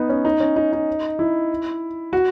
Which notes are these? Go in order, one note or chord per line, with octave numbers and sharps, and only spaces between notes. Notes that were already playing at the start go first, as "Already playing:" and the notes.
Already playing: B3 D#4
C#4
D#4
C#4
D#4
D#4
E4
F#4